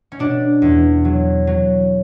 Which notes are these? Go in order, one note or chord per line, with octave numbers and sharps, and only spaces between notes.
C#4
B2 D4
E2
F#3
F#3